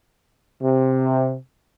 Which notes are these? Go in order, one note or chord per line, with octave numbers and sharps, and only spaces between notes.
C3